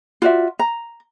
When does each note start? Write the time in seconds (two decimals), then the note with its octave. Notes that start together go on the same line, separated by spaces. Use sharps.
0.22 F4 F#4 D5 E5
0.59 A#5